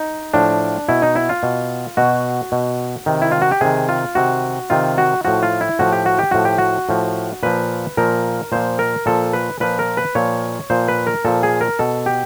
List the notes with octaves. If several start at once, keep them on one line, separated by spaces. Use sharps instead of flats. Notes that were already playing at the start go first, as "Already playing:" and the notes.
Already playing: D#4
A2 F3 D4
B2 E4
D#4
E4
F4
B2
B2 F#4
B2
C3 D#3
E4
F4
F#4
G4
C3 D#3 G#4
F4
C3 D#3 F#4
C3 D#3 F4
F#4
A2 F3 F#4
F4
E4
A2 F3 F#4
G4
F#4
G4
A2 F3 F#4
G4
F#4
A2 F3
A#2 F3 B4
A#2 F3 A#4
A#2 F3 C5
A#4
A#2 F3 A4
B4
A#2 F3 B4
A#4
B4
A#2 F3 C#5
A#2 F3 C5
B4
A#4
A#2 F3 A4
G#4
A#4
B2 A4
G4